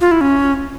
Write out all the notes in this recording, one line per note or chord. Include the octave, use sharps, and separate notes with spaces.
F4
E4
C#4